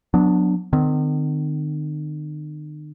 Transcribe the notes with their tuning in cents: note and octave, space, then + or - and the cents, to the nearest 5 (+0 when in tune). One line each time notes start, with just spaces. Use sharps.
F#3 -25 B3 +0 D4 +0
D#3 -45 C4 -45